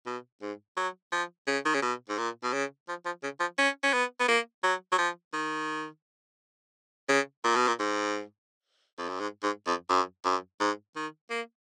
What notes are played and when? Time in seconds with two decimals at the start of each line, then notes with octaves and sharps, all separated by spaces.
0.07 B2
0.42 G#2
0.77 F#3
1.12 F3
1.47 C#3
1.66 D#3
1.75 C#3
1.82 B2
2.09 G#2
2.18 A#2
2.43 B2
2.54 C#3
2.89 F3
3.06 F3
3.24 C#3
3.40 F3
3.58 C#4
3.84 C#4
3.93 B3
4.20 B3
4.28 A#3
4.64 F#3
4.92 F#3
4.99 F3
5.34 D#3
7.09 C#3
7.44 A#2
7.56 B2
7.68 A#2
7.80 G#2
8.98 F2
9.09 F#2
9.20 G#2
9.43 G#2
9.67 F2
9.90 F#2
10.25 F#2
10.61 G#2
10.96 D#3
11.31 A#3